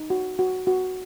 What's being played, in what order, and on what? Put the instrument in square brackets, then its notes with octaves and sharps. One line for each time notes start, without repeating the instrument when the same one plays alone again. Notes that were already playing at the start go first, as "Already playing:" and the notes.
Already playing: [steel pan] D#4
F#4
F#4
F#4